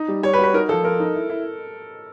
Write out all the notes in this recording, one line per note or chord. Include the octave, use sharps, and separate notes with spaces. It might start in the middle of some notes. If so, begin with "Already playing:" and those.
Already playing: D#4
G3
G3 C#5
B4
F#4
B4
D#4 A#4
F3 A4
F3 A#4
D#4
E4
E4